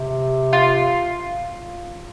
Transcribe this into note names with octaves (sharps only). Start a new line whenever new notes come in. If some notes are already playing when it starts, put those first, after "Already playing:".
Already playing: C3
F4